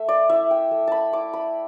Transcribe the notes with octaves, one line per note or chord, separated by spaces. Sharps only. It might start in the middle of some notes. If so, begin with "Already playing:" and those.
Already playing: A3 E5
D5
E4 E5
G5
A3
A5 B5
E4 D6
B5